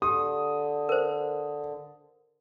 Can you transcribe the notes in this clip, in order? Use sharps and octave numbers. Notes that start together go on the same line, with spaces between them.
D3 G4 D#6
A#4 C5